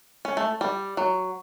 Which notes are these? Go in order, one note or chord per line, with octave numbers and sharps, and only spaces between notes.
C#4
A3
G3
F#3